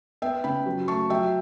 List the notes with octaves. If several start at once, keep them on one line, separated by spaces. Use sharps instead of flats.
B3 E5 G5
C#3 G5 B5
F#3
A3 A5 C#6
F#3 E5 G5